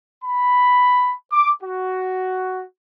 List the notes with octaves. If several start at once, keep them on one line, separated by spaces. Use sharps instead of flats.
B5
D6
F#4